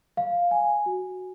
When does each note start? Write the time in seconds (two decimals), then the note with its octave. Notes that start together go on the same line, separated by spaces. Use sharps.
0.17 F5
0.51 G#5
0.86 F#4